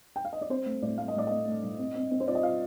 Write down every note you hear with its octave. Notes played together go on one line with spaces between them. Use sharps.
G5
F5
D#5
D5
C4 C5
A3
A2 D5
A3 F5
D#5
A2 D5
A3 D#5
A3
A2
C4
C4
C4
C5
F4 D5
D#5
F4 F5